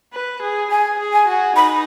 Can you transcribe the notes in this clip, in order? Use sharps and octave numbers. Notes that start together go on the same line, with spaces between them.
B4
G#4
G#4 G#5
G#4
G#5
F#4
D#4 B5